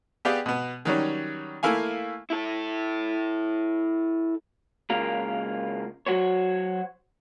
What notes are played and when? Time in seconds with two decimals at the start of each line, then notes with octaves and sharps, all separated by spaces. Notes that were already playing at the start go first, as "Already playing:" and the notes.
0.25 B3 G4 G#4 D5 F5 G5
0.46 B2 B3
0.85 D#3 F#3 G3 C#4
1.63 A3 A#3 E4 F5 G#5
2.30 E4 A4
4.90 C#2 C#3 A#3 F4 A#4
6.07 F#3 F#4 C5 C#5